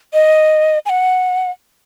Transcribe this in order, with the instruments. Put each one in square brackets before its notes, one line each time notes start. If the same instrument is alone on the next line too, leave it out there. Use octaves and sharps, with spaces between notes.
[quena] D#5
G#5
F#5